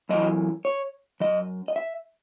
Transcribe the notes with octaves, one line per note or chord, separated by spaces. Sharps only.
F#2 E3 D#5
C#5
F#2 E3 D#5
D#5
E5